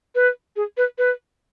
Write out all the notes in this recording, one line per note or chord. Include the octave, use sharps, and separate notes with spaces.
B4
G#4
B4
B4